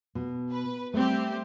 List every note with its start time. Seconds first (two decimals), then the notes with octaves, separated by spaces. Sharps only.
0.15 B2
0.51 B4
0.94 G3 A3 C4 G4